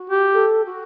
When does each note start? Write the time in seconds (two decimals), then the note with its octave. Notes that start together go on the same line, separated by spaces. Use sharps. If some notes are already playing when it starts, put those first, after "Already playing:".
Already playing: F#4
0.10 G4
0.33 A4
0.65 F#4